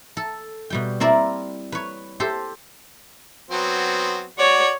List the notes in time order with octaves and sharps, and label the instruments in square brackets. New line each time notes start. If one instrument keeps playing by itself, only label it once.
[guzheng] A4
B2 G3 G5
C4 E4 A#4 D5
B4 C#5
G4 A4 C5
[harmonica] F#3 B3 C4
[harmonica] F#4 D5 [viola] C#5